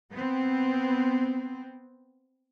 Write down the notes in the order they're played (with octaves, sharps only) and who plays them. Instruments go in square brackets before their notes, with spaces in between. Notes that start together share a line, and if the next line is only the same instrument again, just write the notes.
[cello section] B3 C4